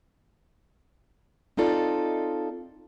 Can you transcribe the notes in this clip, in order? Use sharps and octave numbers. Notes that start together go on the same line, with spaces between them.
C4 D#4 F4 A4 D5 D#5